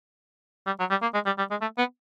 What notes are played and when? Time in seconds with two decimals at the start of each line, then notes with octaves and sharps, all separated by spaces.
0.66 G3
0.80 F#3
0.91 G3
1.02 A#3
1.14 G#3
1.26 G3
1.38 G3
1.51 G#3
1.61 A3
1.78 B3